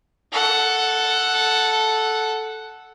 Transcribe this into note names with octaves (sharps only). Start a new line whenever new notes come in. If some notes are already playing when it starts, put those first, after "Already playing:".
A4 F#5